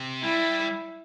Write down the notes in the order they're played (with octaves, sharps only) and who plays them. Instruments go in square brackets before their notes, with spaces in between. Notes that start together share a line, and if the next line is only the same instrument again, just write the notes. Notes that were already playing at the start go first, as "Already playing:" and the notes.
Already playing: [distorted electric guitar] C3
[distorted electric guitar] G3 [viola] E4